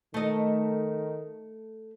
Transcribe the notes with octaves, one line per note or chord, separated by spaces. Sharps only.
D#3 A3 D#5